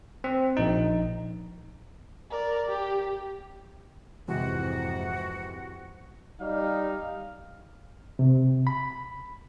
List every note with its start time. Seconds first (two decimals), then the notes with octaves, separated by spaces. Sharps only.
0.24 C4
0.57 A#1 D#4
2.30 A#4 D5
2.69 G4
4.28 F2 G#2 C3 E3 G#3 F#4
6.41 G3 D#4 F5
8.19 C3
8.67 B5